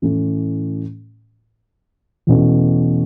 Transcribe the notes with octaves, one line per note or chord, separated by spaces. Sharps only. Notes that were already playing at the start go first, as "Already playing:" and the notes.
A2 E3 A3 C#4
E2 B2 A3 C#4